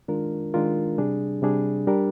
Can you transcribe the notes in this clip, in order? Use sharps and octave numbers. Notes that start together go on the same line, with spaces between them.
D#3 G#3 D4 F4 A#4
D#3 G#3 D4 F4 A#4
C3 G3 D4 G#4
C3 G3 D4 G#4
G3 D4 G4 A#4